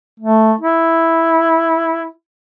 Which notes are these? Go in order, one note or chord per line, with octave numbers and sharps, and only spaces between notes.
A3
E4